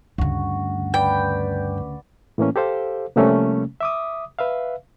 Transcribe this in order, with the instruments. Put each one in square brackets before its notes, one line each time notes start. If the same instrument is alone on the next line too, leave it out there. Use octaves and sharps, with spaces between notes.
[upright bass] D2 C#3 [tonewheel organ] G2 [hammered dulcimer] F#4
[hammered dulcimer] B4 D5 [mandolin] G5
[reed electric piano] A2 E3 A#3 C#4
G4 A4 C5 F5
C3 F3 G3 A3 A#3 C#4
E5 D6 D#6
B4 E5 F5